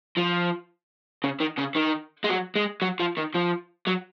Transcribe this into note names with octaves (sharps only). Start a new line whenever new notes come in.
F3
C#3
D#3
C#3
D#3
G#3
F#3
G#3
F#3
F3
D#3
F3
F#3